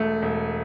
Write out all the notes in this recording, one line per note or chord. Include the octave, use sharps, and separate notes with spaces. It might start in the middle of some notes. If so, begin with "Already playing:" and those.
Already playing: E1 A3
E1